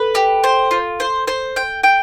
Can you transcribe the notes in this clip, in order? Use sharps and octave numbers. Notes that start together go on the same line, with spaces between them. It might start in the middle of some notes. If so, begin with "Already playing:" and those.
Already playing: A4 B4
G4
C5
F4
C5
C5
G5
G5